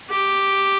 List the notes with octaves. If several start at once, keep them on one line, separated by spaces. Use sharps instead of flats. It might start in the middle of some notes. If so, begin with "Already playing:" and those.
G4